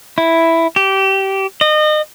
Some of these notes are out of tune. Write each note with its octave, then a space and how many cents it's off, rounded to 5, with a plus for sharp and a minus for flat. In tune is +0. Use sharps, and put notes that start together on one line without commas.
E4 +0
G4 -20
D#5 -30